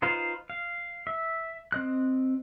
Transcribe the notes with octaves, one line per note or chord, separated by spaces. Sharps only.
D#4 F4 B4 C5 F5
F5
E5
C4 D#5 F#6